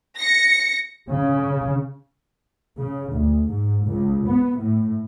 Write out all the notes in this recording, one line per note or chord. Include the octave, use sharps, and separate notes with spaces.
A#6 C#7
C#3
C#3
D2
G#2
C#2
B3
A2